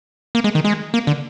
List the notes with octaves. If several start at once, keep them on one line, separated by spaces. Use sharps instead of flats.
A#3
G#3
D#3
G#3
A#3
D3